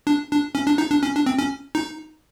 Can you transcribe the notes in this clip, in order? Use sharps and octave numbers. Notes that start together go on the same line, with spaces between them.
D4
D4
C#4
D4
D#4
D4
C#4
D4
C4
C#4
D#4